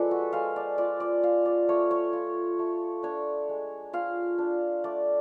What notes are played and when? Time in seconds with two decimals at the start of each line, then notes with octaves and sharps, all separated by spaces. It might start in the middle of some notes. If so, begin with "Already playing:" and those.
Already playing: F3 G#3 A4 B4 D5
0.11 F#4
0.33 G#3 F5
0.56 D5
0.78 F4 D5
1.00 D5
1.23 F4 F5
1.46 D5
1.68 A3 C#5
1.91 C#5
2.13 F4
2.59 A3
3.03 D4 C#5
3.49 G#3
3.93 F4 F5
4.38 D4
4.84 A3 D5